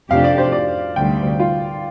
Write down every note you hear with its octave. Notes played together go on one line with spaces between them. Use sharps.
F2 C3 A3 D4 G4 F5
D5
C5
D5
D2 C3 G3 G5
F4